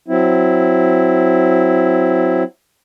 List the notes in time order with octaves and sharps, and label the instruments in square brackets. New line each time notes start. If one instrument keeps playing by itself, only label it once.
[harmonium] F#3 C4 E4